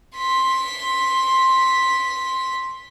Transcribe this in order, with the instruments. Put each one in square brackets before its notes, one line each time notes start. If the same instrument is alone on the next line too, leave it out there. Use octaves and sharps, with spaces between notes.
[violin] C6 B6